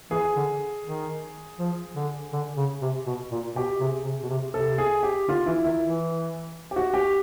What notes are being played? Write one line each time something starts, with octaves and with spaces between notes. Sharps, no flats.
E3 G#4
D3
D#3
F3
D3
D3
C#3
C3
B2
A#2
B2 G4
C3 G#4
C3
B2
C3
C3 A4
G#4
G4
D3 F4
E3 E4
D#3 E4
E3
G4
F#4
G4